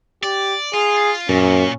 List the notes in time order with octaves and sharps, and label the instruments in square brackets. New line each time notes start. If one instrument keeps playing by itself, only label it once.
[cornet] G4 [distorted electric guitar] D5
[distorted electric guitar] F4 [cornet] G#4
[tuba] F#2 [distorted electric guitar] A#2 [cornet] C#4